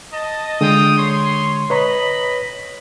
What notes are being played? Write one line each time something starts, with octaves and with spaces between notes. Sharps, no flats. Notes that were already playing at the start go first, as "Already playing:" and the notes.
D#5 A5
D3 G#3 F4 G5 D#6
C#5 C6
B4 C#5 D#5 A#5 B5